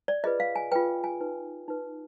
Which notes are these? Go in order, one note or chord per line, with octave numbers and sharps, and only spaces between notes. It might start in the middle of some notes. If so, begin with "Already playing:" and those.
D5
F4 G#4 B4 D#5
F5
G#5
F4 G#4 B4 G5
G#5
D#4 B4
D#4 B4